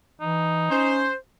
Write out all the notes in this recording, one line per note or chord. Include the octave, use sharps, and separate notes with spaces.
E3 D#4
C#4 C5